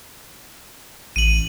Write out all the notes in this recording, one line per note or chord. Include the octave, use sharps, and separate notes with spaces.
A1 D#7 F#7